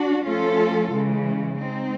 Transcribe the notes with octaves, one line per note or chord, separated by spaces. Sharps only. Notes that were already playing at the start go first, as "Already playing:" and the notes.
Already playing: D4 F#4
F3 A3 C#4 F4 A4
C#3 E3 G#3
G#3 C4 D#4